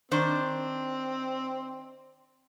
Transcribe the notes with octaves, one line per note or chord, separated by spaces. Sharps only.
D#3 C4 D4 C5